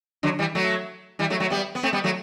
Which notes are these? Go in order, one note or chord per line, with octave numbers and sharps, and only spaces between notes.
D3 F#3
E3 G3
F#3 A3
E3 G3
F#3 A3
F#3 A3
G3 B3
B3
A3 C4
G3 B3
F#3 A3